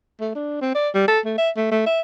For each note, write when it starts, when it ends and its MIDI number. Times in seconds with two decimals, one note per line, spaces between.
0.20 0.34 57
0.35 0.60 62
0.61 0.74 60
0.75 0.89 74
0.94 1.08 55
1.08 1.20 69
1.25 1.37 57
1.38 1.50 76
1.57 1.67 57
1.71 1.85 57
1.86 2.01 76